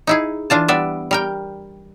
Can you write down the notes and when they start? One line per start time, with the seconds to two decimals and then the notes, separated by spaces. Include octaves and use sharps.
0.07 D#4 E4 G#4
0.50 E3 D4 F4 A5
0.68 G3 B3 D5 E5
1.11 G3 A#4 G5